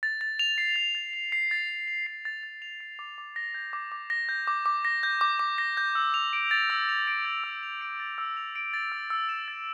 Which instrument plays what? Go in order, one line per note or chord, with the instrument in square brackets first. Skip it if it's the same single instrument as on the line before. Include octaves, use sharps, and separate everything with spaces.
[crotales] A6
A6
F7
C7
A6
A6
F7
C7
A6
A6
F7
C7
A6
A6
F7
C7
D6
D6
A#6
G6
D6
D6
A#6
G6
D6
D6
A#6
G6
D6
D6
A#6
G6
E6
F7
D7
A6
E6
F7
D7
A6
E6
F7
D7
A6
E6
F7
D7
A6
E6
E6
E7
A6